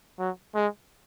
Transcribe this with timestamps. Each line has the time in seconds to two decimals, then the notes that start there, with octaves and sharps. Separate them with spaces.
0.19 F#3
0.55 G#3